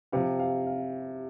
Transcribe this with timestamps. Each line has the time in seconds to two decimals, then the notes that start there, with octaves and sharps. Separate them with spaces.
0.12 C3 F3 F5
0.39 F5
0.67 F5